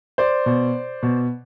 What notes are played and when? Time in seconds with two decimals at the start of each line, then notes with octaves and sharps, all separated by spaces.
0.18 C5 D5
0.46 B2
1.03 B2